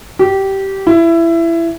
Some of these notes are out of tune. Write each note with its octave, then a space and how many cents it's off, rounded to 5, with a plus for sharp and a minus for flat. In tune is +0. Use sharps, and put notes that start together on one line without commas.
G4 -15
E4 +20